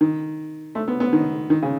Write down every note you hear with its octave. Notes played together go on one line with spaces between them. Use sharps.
D#3
A3
B3
B3
D#3
D#3
C#3